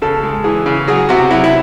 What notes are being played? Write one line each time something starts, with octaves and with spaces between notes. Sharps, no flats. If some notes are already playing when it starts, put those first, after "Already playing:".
C#3 A4
G#3
E3 G#4
C#3
F#3 G#4
C3 F#4
F#3 E4
E4